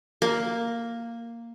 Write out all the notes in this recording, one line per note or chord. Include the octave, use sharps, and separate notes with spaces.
A#3